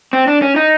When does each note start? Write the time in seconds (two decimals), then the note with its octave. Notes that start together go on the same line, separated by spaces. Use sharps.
0.13 C4
0.27 D4
0.42 C#4
0.56 D#4